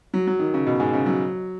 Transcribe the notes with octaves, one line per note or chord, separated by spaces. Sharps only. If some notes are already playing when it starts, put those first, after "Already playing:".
F#3
F#3
D#3
C#3
B2
G#2
C#3
F#3